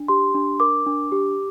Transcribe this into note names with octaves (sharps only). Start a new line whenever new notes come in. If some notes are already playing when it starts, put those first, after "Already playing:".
Already playing: D4
G4 C6
D4
A#4 D6
D4
G4